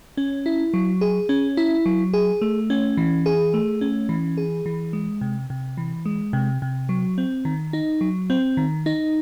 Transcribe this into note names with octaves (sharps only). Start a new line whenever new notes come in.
C#4
E4
F#3
G#4
C#4
E4
F#3
G#4
A3
C#4
E3
G#4
A3
C#4
E3
G#4
E3
G#3
C3
C3
E3
G#3
C3
C3
F#3
C4
D#3
D#4
F#3
C4
D#3
D#4